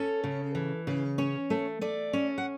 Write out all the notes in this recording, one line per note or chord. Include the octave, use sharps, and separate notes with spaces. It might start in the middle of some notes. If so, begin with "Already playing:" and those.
Already playing: C#4 A4
C#3
E3
C#3
C#4 C#5
A3
A3 D5
C#4
F#5